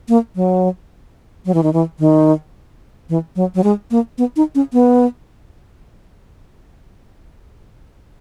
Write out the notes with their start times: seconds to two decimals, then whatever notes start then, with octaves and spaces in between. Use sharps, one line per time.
0.09 A#3
0.35 F#3
1.46 F#3
1.54 E3
1.63 D#3
1.73 E3
1.99 D#3
3.09 E3
3.36 F#3
3.55 F#3
3.64 G#3
3.91 A#3
4.18 B3
4.36 D#4
4.55 C#4
4.73 B3